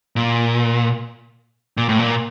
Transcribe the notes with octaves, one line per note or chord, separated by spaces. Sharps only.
A#2
A#2
A2
A#2